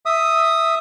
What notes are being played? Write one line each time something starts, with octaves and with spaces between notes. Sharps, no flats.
E5 D#6